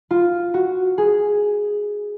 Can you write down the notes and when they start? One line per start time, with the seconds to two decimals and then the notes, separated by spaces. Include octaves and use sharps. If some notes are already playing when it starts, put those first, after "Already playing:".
0.11 F4
0.54 F#4
0.98 G#4